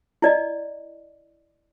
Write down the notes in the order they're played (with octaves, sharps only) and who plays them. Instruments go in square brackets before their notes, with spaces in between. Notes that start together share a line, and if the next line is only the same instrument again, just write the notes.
[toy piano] E4 D5 D#5